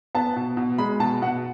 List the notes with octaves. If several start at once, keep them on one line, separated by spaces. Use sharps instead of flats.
B3 A5
B2
B2
G#3 B5
B2 A5
B2 F#5